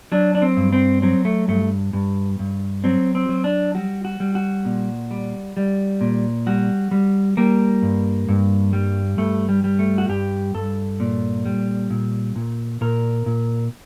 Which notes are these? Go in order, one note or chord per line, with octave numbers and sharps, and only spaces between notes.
F#3 D4
D4
C4
G2
C4
F#3 C4
A3
G2 A3
G2
G2
F#3 C4
C4
F#3
D4
G3 F#4
F#4
G3
F#4
A#2
G3
G3
A#2
G3 F#4
G3
G3 A#3
G2
G2
G3
G2 A3
G3
G3
A3
F#4
G2 G4
G2 A4
A#2
G3
A#2
A#2
A#2 A#4
A#2